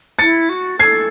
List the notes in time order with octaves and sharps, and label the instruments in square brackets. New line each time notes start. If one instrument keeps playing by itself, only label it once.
[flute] E4 [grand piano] A6 C#7
[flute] F#4
[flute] A4 [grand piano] G#6 C7